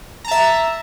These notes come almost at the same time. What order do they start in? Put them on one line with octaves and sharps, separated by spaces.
A#5 A5 E5